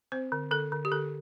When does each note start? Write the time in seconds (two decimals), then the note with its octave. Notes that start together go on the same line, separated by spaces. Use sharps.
0.12 C4 C5
0.32 D3
0.51 D3 A4
0.72 D3
0.85 G4
0.92 D3 A4